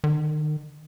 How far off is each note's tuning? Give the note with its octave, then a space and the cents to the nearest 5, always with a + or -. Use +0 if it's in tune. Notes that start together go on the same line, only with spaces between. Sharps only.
D#3 -35